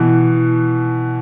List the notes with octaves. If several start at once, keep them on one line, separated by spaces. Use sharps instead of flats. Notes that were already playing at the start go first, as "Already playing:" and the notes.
Already playing: B2 E3